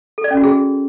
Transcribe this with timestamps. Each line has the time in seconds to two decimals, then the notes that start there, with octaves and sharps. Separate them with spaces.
0.18 A4
0.24 D5
0.31 C#4
0.37 F#4
0.44 G#4